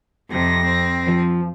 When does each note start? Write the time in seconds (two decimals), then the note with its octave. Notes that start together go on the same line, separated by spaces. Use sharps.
0.30 F2 C3 A#6
0.64 C4
1.08 F3